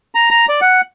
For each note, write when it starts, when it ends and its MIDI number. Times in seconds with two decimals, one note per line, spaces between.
0.15 0.30 82
0.31 0.46 82
0.49 0.60 74
0.61 0.81 78